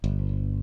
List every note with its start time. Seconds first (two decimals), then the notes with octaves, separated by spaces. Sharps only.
0.04 G1